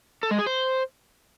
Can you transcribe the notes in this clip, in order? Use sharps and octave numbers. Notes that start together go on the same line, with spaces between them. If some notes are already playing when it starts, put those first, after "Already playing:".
A4
G#3
G#4
C5